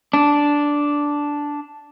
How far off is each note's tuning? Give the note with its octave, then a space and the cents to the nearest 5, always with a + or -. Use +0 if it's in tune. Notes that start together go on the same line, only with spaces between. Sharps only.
D4 -5